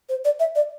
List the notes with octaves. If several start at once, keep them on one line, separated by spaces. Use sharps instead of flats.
C5
D5
E5
D5